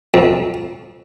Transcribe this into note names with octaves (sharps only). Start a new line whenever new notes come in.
F2